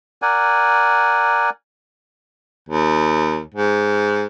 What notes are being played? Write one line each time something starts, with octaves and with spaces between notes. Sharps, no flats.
A#4 D5 F#5 G#5
D#2
G#2